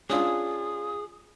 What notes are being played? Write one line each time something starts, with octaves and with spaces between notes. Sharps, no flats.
C#4 D4 F4 G#4 D#6